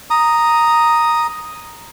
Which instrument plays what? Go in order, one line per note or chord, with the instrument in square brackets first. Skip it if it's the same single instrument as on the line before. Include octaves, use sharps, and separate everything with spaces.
[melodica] A#5 D#6